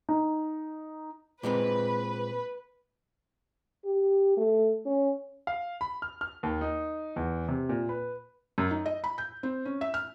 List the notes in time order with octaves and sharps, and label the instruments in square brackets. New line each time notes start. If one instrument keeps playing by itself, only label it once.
[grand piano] D#4
[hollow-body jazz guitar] A#2 G#3 C4 [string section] B4
[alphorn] G4
A3
C#4
[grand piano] F5
B5
F6
F6
D#2
D#4
E2
C3
A#2
B4
[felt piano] F#2
D#4
D#5
B5
G6
C4
C#4
E5
F6